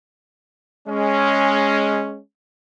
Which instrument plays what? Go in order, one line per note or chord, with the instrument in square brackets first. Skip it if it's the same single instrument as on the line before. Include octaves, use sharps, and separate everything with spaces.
[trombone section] G#3 C#4